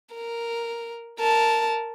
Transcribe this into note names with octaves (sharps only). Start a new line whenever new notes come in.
A#4
A#4 A5